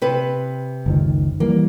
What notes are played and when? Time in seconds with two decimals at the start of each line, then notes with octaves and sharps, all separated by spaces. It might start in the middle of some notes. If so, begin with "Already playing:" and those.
0.02 C3 B4
0.86 F#1 C#2 D#3
1.40 E3 G3 A#3